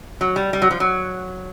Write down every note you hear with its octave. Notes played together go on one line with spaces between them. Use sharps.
F#3
G3
G3
F#3
F3
F#3